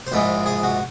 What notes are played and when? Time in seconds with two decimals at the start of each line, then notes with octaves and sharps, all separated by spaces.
0.07 C5
0.12 A#1 G#2 E3 G#3 B4
0.46 G#4
0.63 F#4